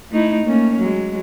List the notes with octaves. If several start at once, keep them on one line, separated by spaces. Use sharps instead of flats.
A3 D#4 E4
A3 A#3 C#4
F#3 G#3